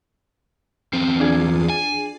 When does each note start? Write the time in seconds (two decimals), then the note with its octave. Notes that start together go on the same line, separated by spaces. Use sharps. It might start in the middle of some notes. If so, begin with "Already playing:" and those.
0.93 E2 C4
1.20 D4 F4 G#4
1.69 G#5